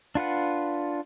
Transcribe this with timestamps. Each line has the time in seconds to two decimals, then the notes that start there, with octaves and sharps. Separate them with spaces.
0.15 D4 F4 B4 F#5